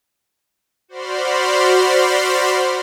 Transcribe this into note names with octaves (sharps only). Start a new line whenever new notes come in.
F#4 C5 D5 B5 C6 F6